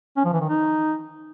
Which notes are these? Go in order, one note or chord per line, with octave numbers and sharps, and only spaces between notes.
C#4
F3
E3
D#3
D#4